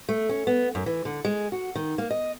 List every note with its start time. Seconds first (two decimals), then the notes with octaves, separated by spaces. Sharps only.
0.09 A3
0.29 C#4
0.47 B3
0.75 F#2
0.86 E3
1.05 D3
1.25 G#3
1.52 F#4
1.75 D#3
1.98 A#3
2.11 D#5